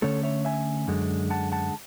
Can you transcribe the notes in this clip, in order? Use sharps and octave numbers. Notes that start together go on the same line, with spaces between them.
D3 A3 C#4 A4 C#5
C#5 E5
E5 G#5
F#2 D3 G#3
F#5 A5
F#5 A5